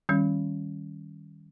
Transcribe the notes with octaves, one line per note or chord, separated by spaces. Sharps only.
D#3 G3 C#4